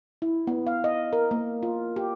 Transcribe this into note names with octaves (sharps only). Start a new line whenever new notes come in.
E4
B3
F5
D#5
A#4
A#3
F4
G4